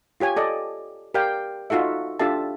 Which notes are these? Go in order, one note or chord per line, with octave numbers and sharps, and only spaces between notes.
F4 G4 C#5 G#5
A4 D5 D#5
G4 A#4 D5 F5 G5
D#4 F4 F#4 A4 E5
D4 F4 G4 A4 E5 A5